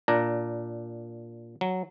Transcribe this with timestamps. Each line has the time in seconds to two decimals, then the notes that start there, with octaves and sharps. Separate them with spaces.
0.08 A#2 D4 A#5
1.61 F#3